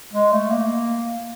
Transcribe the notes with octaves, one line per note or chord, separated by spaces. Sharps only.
G#3
A3
A#3